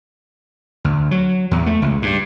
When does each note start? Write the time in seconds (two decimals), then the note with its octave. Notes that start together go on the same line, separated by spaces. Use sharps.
0.84 D2
1.11 F#3
1.51 E2
1.66 A3
1.82 C#2
2.02 G2